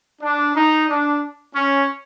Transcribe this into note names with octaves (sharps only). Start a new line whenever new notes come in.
D4
D#4
D4
C#4